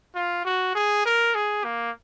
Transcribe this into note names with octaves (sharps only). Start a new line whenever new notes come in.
F4
F#4
G#4
A#4
G#4
A#3